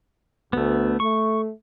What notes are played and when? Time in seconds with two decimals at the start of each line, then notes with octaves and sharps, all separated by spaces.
0.53 D2 A3 B3
1.00 A3 C#6